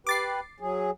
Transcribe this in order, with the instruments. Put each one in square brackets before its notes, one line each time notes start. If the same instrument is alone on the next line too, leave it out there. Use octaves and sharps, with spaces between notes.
[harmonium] G4 B4 [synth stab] D6 A6 C7
[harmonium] F#3 G#4